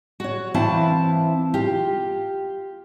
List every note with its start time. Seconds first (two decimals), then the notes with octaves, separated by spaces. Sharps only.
0.20 F#4 C#5
0.54 E3 C4 E4 F5 A5
1.54 F4 G4